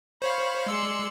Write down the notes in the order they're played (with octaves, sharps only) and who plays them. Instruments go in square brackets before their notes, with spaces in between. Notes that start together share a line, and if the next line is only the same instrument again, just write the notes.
[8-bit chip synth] C5 C#5 F5 [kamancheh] B5 C#6
[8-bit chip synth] G#3 E6 C#7 [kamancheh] D5 C6